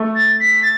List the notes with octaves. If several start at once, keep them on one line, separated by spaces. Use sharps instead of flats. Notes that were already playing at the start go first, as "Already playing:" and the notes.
Already playing: A3
A6
B6
A6